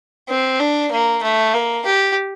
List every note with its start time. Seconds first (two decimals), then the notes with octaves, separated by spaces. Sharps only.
0.29 C4
0.60 D4
0.91 A#3
1.23 A3
1.54 A#3
1.86 G4